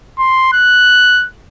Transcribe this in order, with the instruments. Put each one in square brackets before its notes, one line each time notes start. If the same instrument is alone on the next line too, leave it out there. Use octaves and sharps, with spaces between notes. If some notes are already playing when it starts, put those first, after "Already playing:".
[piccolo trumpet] C6
F#6